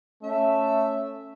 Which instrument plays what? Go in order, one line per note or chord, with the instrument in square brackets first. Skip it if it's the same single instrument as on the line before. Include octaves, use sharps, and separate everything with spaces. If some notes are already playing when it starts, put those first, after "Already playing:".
[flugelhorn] A3 [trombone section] C#4 [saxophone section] E5